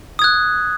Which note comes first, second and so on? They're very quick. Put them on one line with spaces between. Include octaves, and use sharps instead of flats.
D#6 G#6 F#6